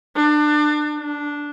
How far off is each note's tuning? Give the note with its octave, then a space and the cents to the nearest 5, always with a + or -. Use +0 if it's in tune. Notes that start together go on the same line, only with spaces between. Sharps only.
D4 +30
D4 -5